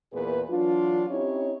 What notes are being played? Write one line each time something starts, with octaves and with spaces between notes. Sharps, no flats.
E2 A#2 A#3 G#4 B4
E3 F#3 D4 F4
C4 C#4 D#4 E4 G4 C#5